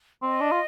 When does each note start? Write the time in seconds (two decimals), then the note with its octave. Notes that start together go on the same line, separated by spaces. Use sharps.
0.22 C4 D#5
0.41 D4
0.52 F4